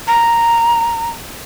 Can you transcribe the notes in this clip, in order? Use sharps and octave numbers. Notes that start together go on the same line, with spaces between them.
A#5